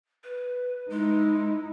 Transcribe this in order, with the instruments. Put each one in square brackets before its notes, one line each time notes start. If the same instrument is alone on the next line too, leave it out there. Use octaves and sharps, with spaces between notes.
[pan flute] B4
[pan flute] G#3 [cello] D#4 E4